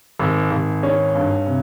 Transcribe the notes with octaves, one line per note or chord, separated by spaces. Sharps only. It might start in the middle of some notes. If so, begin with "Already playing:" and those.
G#1
G#1
C#4
G2
C3